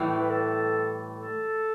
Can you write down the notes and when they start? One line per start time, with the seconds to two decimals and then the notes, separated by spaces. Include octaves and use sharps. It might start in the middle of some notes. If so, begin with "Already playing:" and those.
Already playing: A2 E3 G3
0.19 B4
0.30 A4
1.16 A4